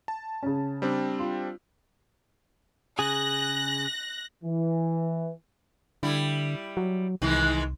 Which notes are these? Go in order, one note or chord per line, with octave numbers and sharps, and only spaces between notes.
A5
C#3 C#4
G3 C4 D4
F4
C#3 G#4 F#6 A#6
E3
D3 G3 E4
F#3
C2 D#3 E3 G#3